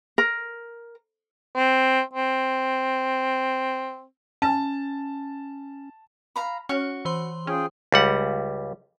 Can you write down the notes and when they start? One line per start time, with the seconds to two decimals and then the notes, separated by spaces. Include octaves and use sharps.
0.18 A#4
1.56 C4
2.14 C4
4.42 C#4 A5
6.36 F5 A#5 B5
6.69 C#4 F#4 C#5 F6
7.05 E3 C5 C6
7.47 C#4 F4 G#4 G5
7.92 C#2 G3 F#5